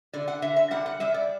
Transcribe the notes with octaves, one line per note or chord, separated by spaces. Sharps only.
D3 D5
F#5
D3 E5
E5
G3 F#5
F#5
G3 E5
D5